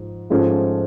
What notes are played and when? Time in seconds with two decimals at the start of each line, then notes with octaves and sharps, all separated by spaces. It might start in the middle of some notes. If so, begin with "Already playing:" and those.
Already playing: G#2 F3
0.30 G#2 F3 A3 C#4